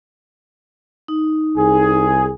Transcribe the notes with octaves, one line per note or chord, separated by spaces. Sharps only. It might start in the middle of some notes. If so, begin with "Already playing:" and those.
D#4
C2 G#4